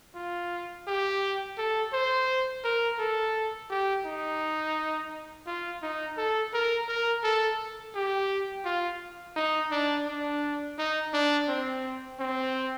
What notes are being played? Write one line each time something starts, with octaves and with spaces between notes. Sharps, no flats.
F4
G4
A4
C5
A#4
A4
G4
D#4
F4
D#4
A4
A#4
A#4
A4
G4
F4
D#4
D4
D4
D#4
D4
C4
C4